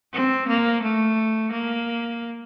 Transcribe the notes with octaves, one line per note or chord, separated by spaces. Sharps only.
C4
A#3
A3
A#3